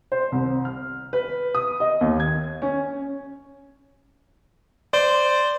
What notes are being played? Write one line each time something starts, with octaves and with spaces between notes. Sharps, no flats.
C5
C2
F6
B4
D#6
D#5
D#2
G#6
C#4
C5 D5